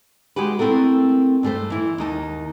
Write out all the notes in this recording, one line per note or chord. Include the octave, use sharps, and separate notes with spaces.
G#3 F#4 G4 B4
A3 C4 E4 A4 A#4
G2 A3 G#4 C5
E3 E4
D#2 D#4 A5